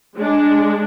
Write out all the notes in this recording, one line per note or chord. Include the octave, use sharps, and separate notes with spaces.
G#3 D4